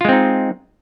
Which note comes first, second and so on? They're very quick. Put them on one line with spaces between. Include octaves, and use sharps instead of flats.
F4 G#3 C4 D#4